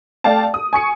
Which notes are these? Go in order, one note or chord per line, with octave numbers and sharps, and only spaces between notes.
A3 D5 F5 G5 A5
D#6
G#5 C#6 C#7